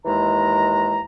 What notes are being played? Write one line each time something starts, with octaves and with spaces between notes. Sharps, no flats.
D#2 E3 G#3 A#5